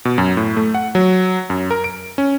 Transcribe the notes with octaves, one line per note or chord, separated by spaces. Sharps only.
B2
F#2
A2
A3
F#5
F#3
F#2
A#4
D7
C#4